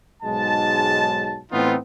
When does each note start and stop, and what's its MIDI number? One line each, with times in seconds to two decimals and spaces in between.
0.23 1.39 35
0.23 1.39 44
0.23 1.39 54
0.23 1.39 56
0.23 1.39 81
1.52 1.76 45
1.52 1.76 52
1.52 1.76 59
1.52 1.76 60
1.52 1.76 63
1.52 1.76 65